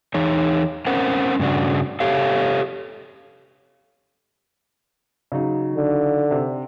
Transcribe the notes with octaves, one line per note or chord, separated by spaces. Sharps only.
E3 D#4 C#5
C4 C#4 A#4 C5 F#5
G2 C#3 D4 F#4
G4 A4 C#5 F5
C#3 F#3 D#4
D3
C3